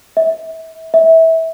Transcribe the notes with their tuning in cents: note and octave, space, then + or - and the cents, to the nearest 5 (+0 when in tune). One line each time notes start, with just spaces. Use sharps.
E5 -30
E5 -20